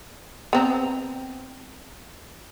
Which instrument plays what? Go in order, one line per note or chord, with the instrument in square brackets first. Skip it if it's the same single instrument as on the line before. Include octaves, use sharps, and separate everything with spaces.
[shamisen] B3 C4 A#5